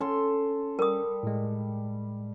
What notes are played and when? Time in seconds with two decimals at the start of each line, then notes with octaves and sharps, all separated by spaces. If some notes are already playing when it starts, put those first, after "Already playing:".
0.01 C#4 A4 C6
0.79 G3 A#4 D#6
1.23 A2 G#3